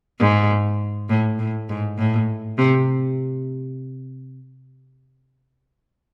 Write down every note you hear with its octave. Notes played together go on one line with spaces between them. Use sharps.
G#2
A2
A2
G#2
A2
C3